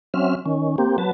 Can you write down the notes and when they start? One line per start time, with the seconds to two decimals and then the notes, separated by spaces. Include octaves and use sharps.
0.14 F#3 C4 C#4 E5 F6
0.46 D#3 C#4
0.78 A#3 C4 G4
0.98 F#3 B4 A5